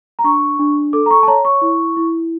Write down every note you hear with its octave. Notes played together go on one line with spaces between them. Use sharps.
A#5
D4 C#6
D4
A4 D6
A#5
C#6
A5
C#5 A#5
C#6
E4
E4